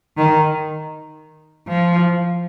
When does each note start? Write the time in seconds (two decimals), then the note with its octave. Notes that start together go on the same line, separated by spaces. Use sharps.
0.18 D#3
1.68 F3